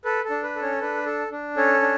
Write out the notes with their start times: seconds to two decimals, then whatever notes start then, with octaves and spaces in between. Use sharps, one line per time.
0.05 A4 B4
0.24 A4
0.30 D4
0.43 B4
0.56 A4
0.62 C#4 C#5
0.81 D4 B4
1.06 A4
1.32 D4
1.57 C#4 A4 C#5
1.82 D4